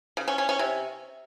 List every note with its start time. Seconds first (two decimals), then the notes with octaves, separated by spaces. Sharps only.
0.17 C#3
0.28 C#4
0.38 C#4
0.49 C#4
0.59 C3